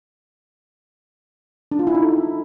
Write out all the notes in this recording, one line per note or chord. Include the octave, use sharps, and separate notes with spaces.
D4
F4
E4
D#4
A4